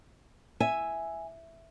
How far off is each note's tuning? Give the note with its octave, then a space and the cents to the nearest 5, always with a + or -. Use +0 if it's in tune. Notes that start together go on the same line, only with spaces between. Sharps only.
E5 +0 G#5 +0